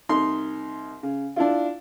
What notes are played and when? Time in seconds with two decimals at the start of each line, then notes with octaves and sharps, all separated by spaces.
0.09 C2 D#4 C6
1.03 C#3
1.36 D4 E4 F4